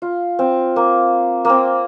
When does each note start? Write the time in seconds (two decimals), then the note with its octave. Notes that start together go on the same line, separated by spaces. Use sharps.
0.02 F4
0.39 C4
0.76 A#3
1.45 A#3 C4